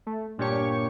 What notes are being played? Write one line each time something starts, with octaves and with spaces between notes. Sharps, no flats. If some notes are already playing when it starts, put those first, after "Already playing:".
A3
G1 A#2 D4 G4 C#5 C#6